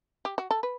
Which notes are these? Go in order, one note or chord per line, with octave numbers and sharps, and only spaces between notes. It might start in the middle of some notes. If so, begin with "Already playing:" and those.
G4
F#4
A4
B4